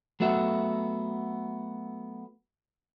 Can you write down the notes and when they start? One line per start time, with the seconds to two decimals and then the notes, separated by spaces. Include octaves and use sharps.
0.20 F#3 A3 B3 F#4 E5